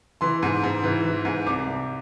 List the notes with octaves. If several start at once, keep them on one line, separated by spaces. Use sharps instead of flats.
E3 C6
G#2
G#2
E3
E3
G#2
C2 D6
C2